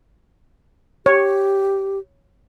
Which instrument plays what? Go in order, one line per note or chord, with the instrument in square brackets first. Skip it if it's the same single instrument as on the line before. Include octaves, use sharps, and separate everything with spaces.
[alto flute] G4 [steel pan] C#5